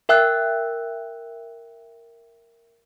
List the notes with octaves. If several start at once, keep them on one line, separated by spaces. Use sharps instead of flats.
A#4 E5 G5 E6 F#6